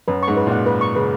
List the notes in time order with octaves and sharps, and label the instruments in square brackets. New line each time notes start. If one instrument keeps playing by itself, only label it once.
[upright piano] F#2 [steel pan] B4
[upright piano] G#2 [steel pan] C#6
[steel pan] B4
[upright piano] A#2 [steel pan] F#5
[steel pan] B4
C#6
[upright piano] C#3 [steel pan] B4